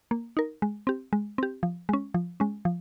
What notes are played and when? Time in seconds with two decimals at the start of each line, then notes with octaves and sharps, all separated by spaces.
0.11 A#3
0.37 D#4 A#4
0.62 G#3
0.87 C4 G4
1.13 G#3
1.38 C4 G4
1.63 F3
1.89 G#3 C#4
2.14 F3
2.40 G#3 C#4
2.65 F3